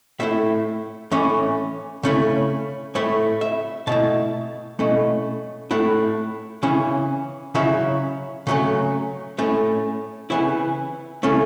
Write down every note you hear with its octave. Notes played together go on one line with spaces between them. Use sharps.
A2 A3 E4 E5
A2 E3 C#4
C#3 A3 C#4 E4
A2 A3 E4 C#5
E5
B2 A3 E4 A5
B2 A3 C#4 E4
A2 A3 E4 F#5
C#3 E3 C#4 E4
C#3 F#3 C#4 E4 E5
C#3 F#3 A3 C#4
A2 A3 C#4
C#3 E3 B3 E4 C#5
C#3 A3 C#4 E4